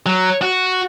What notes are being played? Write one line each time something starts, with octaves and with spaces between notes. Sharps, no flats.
F#3
F#4